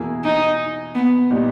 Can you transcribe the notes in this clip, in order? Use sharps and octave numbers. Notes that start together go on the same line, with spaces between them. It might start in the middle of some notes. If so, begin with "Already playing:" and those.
Already playing: E2 B2 A#3 E4 G#4
D#4
B3
A#2 G3 B3 D#4 G4